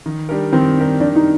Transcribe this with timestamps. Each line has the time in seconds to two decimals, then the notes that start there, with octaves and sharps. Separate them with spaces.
0.06 D#3
0.29 G3 D4 G4 A#4
0.53 D#3 C4
0.77 G3 D4 G4 A#4
1.00 D#3 D4
1.15 D#4